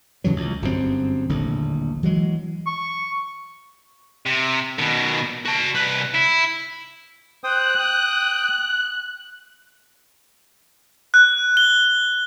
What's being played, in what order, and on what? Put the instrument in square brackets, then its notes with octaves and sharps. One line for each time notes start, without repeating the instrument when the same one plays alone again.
[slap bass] D#2 C#3 E3 F#3
C#2
G1 F#2 C3 C4
D#1 A#1 A2 D3
E3 F#3 G#3
[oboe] C#6
[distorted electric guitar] C3
B2 D#3
F#4 A5
C2 B4
E4
[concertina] C5 G5 D#6 [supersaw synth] F#6
[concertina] G5 D#6
[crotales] F#6
G7